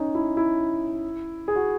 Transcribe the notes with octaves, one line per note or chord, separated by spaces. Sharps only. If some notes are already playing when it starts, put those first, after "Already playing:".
Already playing: C#4 D#4
E4
E4
G#4
F#4